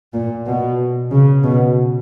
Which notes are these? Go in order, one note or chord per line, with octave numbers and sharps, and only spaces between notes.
A#2
B2
C#3
B2